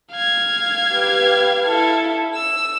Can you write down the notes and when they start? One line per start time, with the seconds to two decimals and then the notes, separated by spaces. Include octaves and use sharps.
0.12 F5 G#6
0.93 G4 B4
1.66 E4 A4
2.36 E6